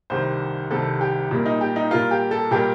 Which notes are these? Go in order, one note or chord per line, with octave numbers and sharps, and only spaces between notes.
C2 C3 D#3 G3 C5
C2 C3 D#3 G3 A4
G4
A#2 G3 A#3
D#4
G4
D#4
A#2 G3 A#3 F4
G4
A4
A#2 G3 A#3 G4